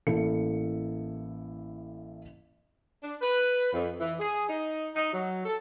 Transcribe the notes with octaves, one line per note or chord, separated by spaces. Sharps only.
A1 A#3 E4 A4 C#7
D4
B4
F2
E3
G#4
D#4
D#4
F#3
A4